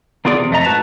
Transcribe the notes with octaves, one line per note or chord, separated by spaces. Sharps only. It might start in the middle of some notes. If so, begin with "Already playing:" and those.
A#3 B3 F4 G#4 D5
E2 C3
F2 A3 D#5 A#5
G#2 A3 F#4 B4 A5 A#5